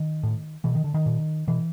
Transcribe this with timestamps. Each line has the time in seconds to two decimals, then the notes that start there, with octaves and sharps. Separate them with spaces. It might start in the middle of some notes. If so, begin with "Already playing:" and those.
Already playing: D#3
0.23 A2
0.64 B2 E3
0.75 D#3
0.84 D3
0.94 D#3
1.06 A#2
1.47 B2 E3